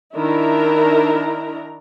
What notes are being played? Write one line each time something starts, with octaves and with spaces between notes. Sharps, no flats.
D#3 D4 E4 A#4 A#5